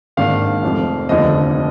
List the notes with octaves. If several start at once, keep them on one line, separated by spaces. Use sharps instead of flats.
G#1 G#2 D#3 A#3 D4 F5
F1 F2 F3
F1 D#2 D3 F3 B3 D#5